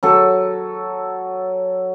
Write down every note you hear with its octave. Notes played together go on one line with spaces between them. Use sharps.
F#3 A4